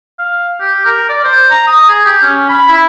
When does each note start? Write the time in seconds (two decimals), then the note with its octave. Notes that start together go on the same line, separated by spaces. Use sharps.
0.19 F5
0.61 G4
0.85 A#4
1.09 D5
1.24 C5
1.51 A#5
1.67 D#6
1.89 G#4
2.05 G4
2.22 C#4
2.49 B5
2.69 E4